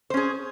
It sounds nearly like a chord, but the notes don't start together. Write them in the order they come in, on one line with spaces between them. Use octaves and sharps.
C5 C#4 G#4